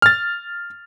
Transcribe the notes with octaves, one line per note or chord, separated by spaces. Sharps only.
F6 A6